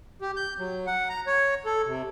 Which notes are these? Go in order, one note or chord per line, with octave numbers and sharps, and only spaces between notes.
G4
G6
F#3
F#5
A#5
C#5
A4
C3